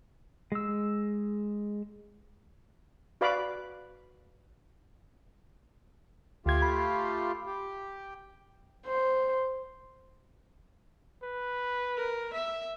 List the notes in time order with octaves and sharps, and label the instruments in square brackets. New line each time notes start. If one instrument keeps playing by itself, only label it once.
[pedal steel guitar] G#3 E6
[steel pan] F#4 B4 D5 F5 B5 D6
[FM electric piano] D2 G#6 [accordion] A3 F4 G4
[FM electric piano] B5
[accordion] G4
[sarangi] C5
[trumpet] B4
[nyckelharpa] A#4
E5